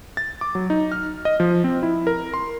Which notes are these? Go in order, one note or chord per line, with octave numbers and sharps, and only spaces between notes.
A6
D6
F#3
D#4
F6
D#5
F3
C4
E4
A#4
C6